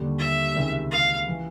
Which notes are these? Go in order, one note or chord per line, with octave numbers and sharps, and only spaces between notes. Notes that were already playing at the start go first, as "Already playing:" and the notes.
Already playing: D#2 D3 G3
E5
C#2 C3 D#3 G#3
F5
E3